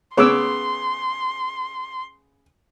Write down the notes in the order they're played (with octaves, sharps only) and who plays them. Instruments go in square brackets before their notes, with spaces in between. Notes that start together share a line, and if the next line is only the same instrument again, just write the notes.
[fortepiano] C#3 B3 [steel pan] C#5 D6 E6 [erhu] C6